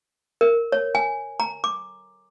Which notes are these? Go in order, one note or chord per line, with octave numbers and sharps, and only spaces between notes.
A#4
C#5
G#5
A#5
D6